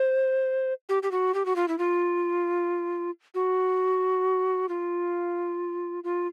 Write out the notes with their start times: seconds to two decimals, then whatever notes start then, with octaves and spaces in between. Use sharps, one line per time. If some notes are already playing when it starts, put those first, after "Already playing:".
Already playing: C5
0.89 G4
1.03 G4
1.12 F#4
1.34 G4
1.46 F#4
1.56 F4
1.68 E4
1.79 F4
3.35 F#4
4.69 F4
6.04 F4